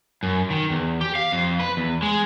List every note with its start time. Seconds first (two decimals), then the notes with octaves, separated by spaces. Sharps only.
0.23 F#2
0.50 D#3
0.70 E2
1.01 G4
1.15 F5
1.32 F2
1.59 B4
1.77 E2
2.02 G#3